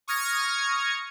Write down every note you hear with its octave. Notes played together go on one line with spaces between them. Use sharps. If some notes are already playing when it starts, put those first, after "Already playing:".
C#6 D#6 F6 G#6 A#6 C#7